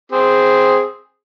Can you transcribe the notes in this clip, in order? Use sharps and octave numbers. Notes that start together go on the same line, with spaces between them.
C4 G#4